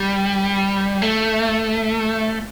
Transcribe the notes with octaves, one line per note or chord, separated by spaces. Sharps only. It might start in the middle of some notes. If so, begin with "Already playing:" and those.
Already playing: G3
A3